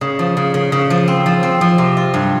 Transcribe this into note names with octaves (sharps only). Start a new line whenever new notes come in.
C#3
F3
C#3
C#3
C#3
F3
C4
F3
C4
F3
C3
F4
G2